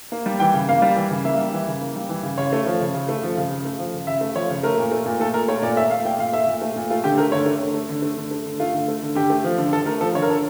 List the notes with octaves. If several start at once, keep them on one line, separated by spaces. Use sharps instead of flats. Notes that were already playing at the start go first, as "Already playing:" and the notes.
A#3
G3
E3 G5
C#3
A#3 F5
G3
E3
C#3
A#3 E5
G3
E3
C#3
A#3
G3
E3
C#3
C#3 C#5
A3
F3
C#3
C#3
A3
F3
C#3
C#3
A3
F3
C#3
C#3 E5
A3
F3 C#5
C#3
A3 A#4
A#2
A3
A#2
A3 A4
A#2 A#4
A3 C#5
A#2 D5
A3 E5
A#2 F5
A3 G5
A#2 F5
A3 E5
A#2
A3
A#2
A3 F4
D3 G4
A3 A#4
D3 C#5
A3
D3
A3
D3
A3
D3
A3
D3
A3 F4
D3
A3
D3
D3 G4
A3
F3
D3
D3 A4
A3 A#4
F3 A4
D3 C#5
A#4
D3 A4